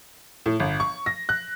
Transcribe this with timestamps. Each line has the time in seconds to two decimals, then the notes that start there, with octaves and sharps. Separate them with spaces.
0.46 A2
0.60 G1
0.80 C#6
1.06 A#6
1.29 F#6